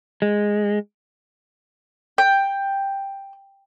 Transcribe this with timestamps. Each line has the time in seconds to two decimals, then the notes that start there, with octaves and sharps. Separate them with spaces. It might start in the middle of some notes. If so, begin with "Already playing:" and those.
0.22 G#3
2.18 G5